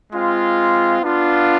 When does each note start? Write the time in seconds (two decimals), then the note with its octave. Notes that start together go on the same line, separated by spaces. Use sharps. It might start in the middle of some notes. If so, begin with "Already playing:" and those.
0.12 G#3 C4 F4
1.01 B3 D4 F4